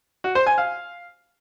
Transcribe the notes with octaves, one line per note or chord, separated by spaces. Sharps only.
F#4
C5
G#5
F5